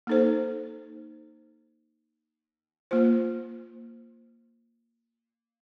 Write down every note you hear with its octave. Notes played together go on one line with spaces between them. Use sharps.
A#3 D#4 A4 C5
A#3 F4 C5